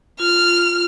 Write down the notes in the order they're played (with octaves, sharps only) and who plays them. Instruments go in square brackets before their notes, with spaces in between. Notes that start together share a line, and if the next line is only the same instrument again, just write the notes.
[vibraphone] F4 [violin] F6